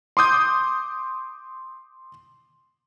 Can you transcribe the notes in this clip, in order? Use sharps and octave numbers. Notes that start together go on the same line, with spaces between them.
C6 D6 D#6 G6